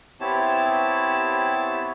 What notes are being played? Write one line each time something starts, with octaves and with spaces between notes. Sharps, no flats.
B3 C4 E4 G4 C#5 A5